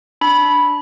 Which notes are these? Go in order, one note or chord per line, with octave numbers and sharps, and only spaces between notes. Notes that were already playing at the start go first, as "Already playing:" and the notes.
D4 B5